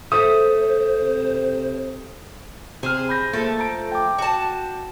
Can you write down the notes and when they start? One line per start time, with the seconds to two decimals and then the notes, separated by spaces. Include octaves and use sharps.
0.12 A3 C5 D#6
1.02 C3
2.83 C3 G#4 C5 F6
3.09 B5 G6 A#6
3.33 F3 A3 A#3 A4
3.60 A#5 D7
3.92 G5 D6
4.18 F#4 A5